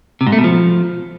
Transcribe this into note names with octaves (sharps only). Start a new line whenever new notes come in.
C3
G#2
A3
B2
F3